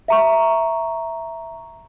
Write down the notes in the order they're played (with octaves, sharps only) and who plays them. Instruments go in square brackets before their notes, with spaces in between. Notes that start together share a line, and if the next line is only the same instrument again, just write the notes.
[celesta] E5 A#5 C#6